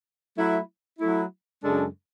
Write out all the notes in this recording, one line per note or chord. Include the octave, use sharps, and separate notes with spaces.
F#3 A3 E4
F#3 A3 E4
F#2 C#3 G#3 D4 A4